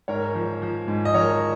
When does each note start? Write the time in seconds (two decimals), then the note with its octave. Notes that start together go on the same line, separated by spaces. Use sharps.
0.08 G#2 A#4 C#5
0.35 F3
0.62 F3
0.88 G#2
1.05 D#5
1.14 F3 A#4 C#5